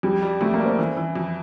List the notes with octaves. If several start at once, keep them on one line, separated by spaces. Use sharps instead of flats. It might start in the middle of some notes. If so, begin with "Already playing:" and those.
F2 G3
G3
F2 A3
A#3
G3
C4
E3
E3
F2